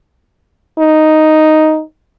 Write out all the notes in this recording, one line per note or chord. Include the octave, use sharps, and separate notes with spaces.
D#4